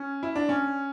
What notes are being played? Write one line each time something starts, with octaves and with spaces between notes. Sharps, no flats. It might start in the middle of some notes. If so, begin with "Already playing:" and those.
Already playing: C#4
E4
D4
C#4